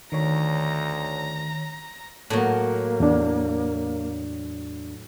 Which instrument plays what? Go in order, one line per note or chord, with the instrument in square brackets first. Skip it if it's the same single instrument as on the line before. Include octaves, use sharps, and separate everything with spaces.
[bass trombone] D2 [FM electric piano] D#3 C#5 [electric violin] A#5
[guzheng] A2 F#3 [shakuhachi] A#3
[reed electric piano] E2 D4